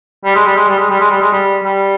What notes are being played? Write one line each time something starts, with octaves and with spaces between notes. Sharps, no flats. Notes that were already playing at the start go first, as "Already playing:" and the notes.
G3
G#3
G3
G#3
G3
G#3
G3
G#3
G3
G#3
G3
G3